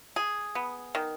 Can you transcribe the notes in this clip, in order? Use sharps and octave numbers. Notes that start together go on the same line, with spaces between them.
G#4
B3
D#3